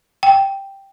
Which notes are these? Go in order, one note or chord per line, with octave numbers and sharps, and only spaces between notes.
G5